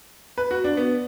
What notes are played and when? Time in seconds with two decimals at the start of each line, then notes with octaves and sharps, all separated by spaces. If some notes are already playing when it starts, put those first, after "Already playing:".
0.38 B4
0.51 F#4
0.64 D4
0.77 B3